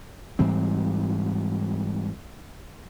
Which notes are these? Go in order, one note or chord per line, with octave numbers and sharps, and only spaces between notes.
G#2 E3 G3 C4